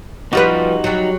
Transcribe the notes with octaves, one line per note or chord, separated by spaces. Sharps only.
F3 G3 D#4 F#4 B4
F#3 G3